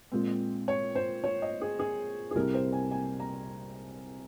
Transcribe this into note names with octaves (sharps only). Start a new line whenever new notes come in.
A#2 G#3 C4
C#5
C5
C#5
D#5
G#4
G#4
G#4
C2 C3 G3 C4 A#4
C5
G#5
G#5
A#5